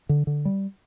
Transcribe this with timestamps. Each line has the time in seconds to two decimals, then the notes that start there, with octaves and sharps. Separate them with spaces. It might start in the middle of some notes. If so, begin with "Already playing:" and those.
0.09 D3
0.27 D3
0.45 G3